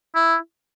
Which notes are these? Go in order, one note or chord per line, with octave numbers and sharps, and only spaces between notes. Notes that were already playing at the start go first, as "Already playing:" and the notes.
E4